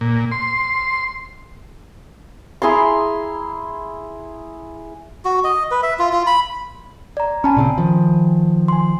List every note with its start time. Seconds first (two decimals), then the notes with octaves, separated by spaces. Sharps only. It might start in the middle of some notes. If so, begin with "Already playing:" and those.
0.01 A#2
0.32 C6
2.62 E4 G#4 A#5 C6
5.25 F#4
5.44 D#5
5.71 B4
5.83 E5
5.99 F4
6.13 F4
6.27 B5
7.17 D5 A#5
7.44 C#4 G#5 A5 B5
7.57 A#2 C#3 C4
7.78 D#3 F3
8.68 G#5 C6